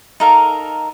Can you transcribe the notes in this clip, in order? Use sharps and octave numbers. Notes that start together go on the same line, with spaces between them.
D#4 A4 A#4 F5